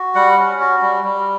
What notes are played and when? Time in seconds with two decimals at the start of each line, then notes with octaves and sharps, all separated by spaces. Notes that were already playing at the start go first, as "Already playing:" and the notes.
Already playing: F#4
0.15 G3 F#5
0.38 C#4
0.60 F#4
0.82 G3
1.04 G3